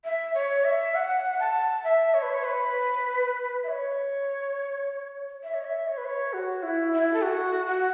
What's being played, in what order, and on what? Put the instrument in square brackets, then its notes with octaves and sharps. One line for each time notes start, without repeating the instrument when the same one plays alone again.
[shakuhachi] E5
C#5
E5
F#5
A5
E5
C#5
B4
C#5
B4
E5
C#5
E5
C#5
E5
C#5
B4
C#5
F#4
E4
E4
A4
F#4
F#4